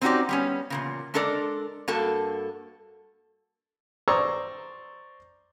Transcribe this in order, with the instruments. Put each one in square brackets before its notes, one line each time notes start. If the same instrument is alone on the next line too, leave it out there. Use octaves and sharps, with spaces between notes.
[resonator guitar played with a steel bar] C4 C#4 D#4 F#4 G4 D5
G3 B3 C#4
E2 A#2 C#3
G#3 D4 A4 A#4 D5
G2 A#3 F#4 A4 A5
[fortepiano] C5 D5 A#5 C#6 D#6 E6